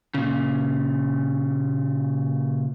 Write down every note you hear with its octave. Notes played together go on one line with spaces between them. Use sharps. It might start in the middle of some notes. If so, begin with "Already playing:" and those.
A#2 C#3